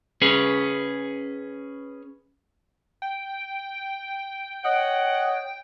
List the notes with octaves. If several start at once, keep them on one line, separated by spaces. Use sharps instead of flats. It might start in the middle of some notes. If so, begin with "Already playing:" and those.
C#4 G#4 B4
G5
C#5 D#5 F#5